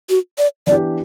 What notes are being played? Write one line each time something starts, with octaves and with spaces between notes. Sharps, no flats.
F#4
D5
E3 B3 D4 G4 D5